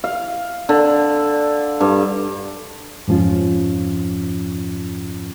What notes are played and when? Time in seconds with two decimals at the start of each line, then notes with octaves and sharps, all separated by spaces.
0.04 F5
0.69 D3
1.81 G2
3.08 F2 G#2 F3 C#4 F4